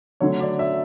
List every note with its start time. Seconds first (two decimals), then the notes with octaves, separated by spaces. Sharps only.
0.20 D3 F#3 A3 C#5
0.40 D5
0.59 E5